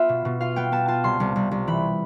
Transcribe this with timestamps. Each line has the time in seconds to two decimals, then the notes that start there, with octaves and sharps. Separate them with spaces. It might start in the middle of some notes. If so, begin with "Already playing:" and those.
Already playing: B3 F4 E5
0.09 B2
0.25 B2
0.41 F4 F5
0.56 B3 G5
0.72 B3 A5
0.88 F4 A5
1.04 C2 C6
1.20 C2
1.36 C2
1.51 C2
1.67 E3 B5